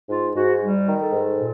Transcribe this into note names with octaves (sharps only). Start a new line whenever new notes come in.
G#2 F4
G#2 F#4
G3
D#3
A4
G#2
A#2